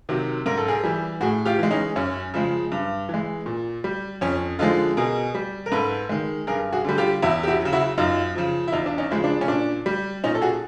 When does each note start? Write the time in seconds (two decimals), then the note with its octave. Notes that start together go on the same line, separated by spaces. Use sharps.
0.09 C3 D#3 F#3
0.46 G#2 A#4
0.57 A4
0.68 G#4 A#4
0.84 E3 G3
1.21 A2 F#4 G#4
1.46 F4 G4
1.59 E3 G#3
1.71 C#4 D#4
1.96 F#2 C#4
2.34 C#3 F3 G#3
2.72 G2
3.09 E3
3.14 G#3
3.46 A#2
3.84 G3
4.21 F2 C#4
4.59 D3 F3 G#3 D#4 F4
4.97 B2 G#4 A#4
5.35 G3
5.66 A#4
5.72 G#2 A4 B4
6.09 D#3 G#3
6.47 G2 G#4 A#4
6.73 F#4 G#4
6.84 D3 G3
6.98 F4 G4
7.23 E2 E4 F#4
7.43 G4
7.47 E4 F#4
7.61 C#3 F#3
7.72 E4 F#4
7.98 F#2 D#4 F4
8.35 C#3 F3
8.68 E4
8.72 E2 D#4 F4
8.86 D4
8.98 C#4 D#4
9.10 C#3 F3 G#3
9.24 D4
9.41 C#4
9.48 A#2 D4
9.86 G3
10.24 A#2 C#4 D#4
10.35 A4
10.42 F#4 G#4